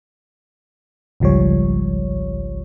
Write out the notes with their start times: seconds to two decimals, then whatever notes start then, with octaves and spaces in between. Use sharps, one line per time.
1.20 G#1 C#2 F3 G3 C#5